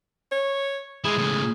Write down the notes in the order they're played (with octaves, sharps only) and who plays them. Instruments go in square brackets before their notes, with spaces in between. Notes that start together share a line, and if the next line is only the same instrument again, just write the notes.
[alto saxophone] C#5
[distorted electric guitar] G#3 E4 [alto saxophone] G#4
[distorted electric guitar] C#2 A2